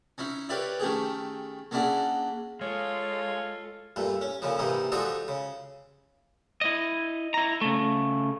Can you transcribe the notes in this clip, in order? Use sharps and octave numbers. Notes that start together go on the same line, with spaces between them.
C#4 D#4 E4
G4 A#4 B4 C#5 D5 E5
D#3 A3 C#4 G4 G#4
A#3 C#4 D4 E4 F#4 G#4
G#3 F4 A4 C#5 F5
G2 A#2 A3
C#4
F2 A#2 C#3 F3
G#2 C3 E3 A#3 D#4
F3 G#3 D4 D#4 F#4 A4
C#3
E4 D#5
E4 A#5
C#3 A3